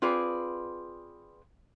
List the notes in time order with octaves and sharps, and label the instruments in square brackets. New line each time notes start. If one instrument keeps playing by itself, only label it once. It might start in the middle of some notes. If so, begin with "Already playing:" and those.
[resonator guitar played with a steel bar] C4 F4 G#4 B4 D5